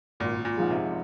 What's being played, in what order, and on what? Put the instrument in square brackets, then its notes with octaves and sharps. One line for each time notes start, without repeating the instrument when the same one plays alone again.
[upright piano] G#1 [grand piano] A#2
[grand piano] A#2
[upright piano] G#2 F3 G#3
[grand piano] C3